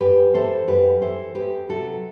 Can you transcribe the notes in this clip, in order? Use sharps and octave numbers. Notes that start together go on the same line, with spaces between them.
F#2 G4 B4
E3 A4 C5
F#2 G4 B4
E3 A4 C5
E2 G4 B4
C3 F#3 F#4 A4